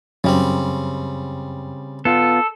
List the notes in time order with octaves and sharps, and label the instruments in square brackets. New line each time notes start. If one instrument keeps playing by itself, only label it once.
[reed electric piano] F#2 [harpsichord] C#3 G3 C4
[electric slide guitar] B3 F4 [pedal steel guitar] A4